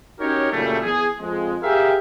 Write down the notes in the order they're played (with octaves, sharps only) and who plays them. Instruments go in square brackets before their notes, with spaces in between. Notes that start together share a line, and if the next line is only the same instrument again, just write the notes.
[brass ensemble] C#4 D#4 F#4 G4 A#4 C#5
F#2 A#2 C#3 G3 A3
E2 G#4
F2 G#3
G4 G#4 A#4 E5 F5 G5